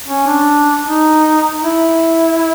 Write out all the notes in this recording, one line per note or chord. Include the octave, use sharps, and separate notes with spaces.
C#4
D4
D#4
E4